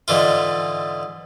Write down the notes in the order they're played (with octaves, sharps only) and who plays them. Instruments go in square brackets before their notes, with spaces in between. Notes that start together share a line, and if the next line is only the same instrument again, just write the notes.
[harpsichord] G#2 D3 E3 F4